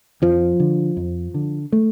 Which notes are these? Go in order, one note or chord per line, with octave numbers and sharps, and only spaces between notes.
F2 F3
D3
F2
D3
A3